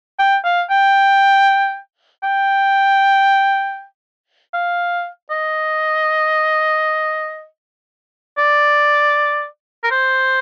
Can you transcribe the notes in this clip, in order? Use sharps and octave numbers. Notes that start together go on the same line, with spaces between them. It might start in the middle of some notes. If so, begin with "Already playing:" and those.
G5
F5
G5
G5
F5
D#5
D5
A#4
C5